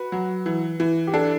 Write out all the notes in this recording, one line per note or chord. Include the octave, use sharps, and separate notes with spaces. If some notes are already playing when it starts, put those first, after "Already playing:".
Already playing: F#4 B4
F#3
E3
E3
G4
D4 A4